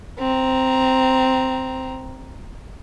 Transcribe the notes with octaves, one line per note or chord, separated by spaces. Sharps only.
C4 A#5